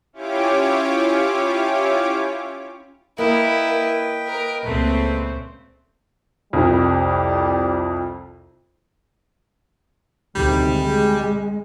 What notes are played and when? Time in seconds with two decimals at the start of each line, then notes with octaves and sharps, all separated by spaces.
0.13 C#4 E4 F4 G4 C#5 D6
3.18 A#3 E4 B4 D#5 G5
4.27 A#4
4.64 C#2 A#2 A3 C4 B4
6.53 C2 F2 G3
10.35 D2 C3 D#3 G3
10.69 G#3